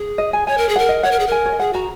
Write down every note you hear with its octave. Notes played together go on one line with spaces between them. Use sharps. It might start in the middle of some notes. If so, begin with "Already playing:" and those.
Already playing: G#4
D#5
G#5
C#5 G#5
A#4
G#4
A#4 F#5
D#5
C#5 F#5
A#4
G#4
A#4 G#5
C#5
D#5
G#4 F#5
F#4 A#5